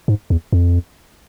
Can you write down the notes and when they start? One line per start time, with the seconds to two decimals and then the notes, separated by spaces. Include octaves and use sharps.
0.08 G#2
0.30 E2
0.53 F2